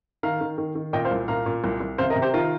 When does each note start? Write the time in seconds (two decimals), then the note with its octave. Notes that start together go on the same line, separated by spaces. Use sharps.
0.23 D#3 F5 A#5
0.41 D#3
0.58 D#3
0.75 D#3
0.93 A#2 D#5 G5
1.05 C5 F5
1.11 C2
1.28 A#2 F5 A#5
1.46 A#2
1.64 C2
1.80 C2
1.98 C3 C5 F5
2.10 A#4 D#5
2.16 C3
2.22 G4 C5
2.33 D#3 F4 A#4